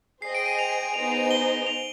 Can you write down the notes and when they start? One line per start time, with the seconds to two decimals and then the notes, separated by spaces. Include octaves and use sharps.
0.22 G#4 C5 D#5 G5 C7
0.35 D7
0.46 D#7
0.59 F7
0.94 B3 D#4 G#4 C5 D#5 F7
1.12 F7
1.31 G7
1.67 F7